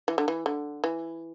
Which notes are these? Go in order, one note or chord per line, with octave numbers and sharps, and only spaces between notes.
E3
D3
E3
D3
E3